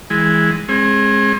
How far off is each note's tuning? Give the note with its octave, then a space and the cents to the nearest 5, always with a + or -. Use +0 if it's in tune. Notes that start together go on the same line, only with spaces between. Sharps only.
E3 -10 G#3 +0
G#3 +0 C4 +45